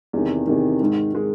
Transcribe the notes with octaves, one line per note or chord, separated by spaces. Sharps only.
E2 C3 D#3
E2 C3 D#3
G#2 D#3 G#3
D#3 G#3